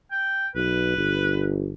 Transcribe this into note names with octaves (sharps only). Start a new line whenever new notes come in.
G5
B1 B4
G1